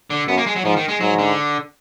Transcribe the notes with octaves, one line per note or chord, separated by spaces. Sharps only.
D3
F#2 B3
A#3
G#3
F#3
G#2 F3
D#3
G#3
G#2 F#3
D3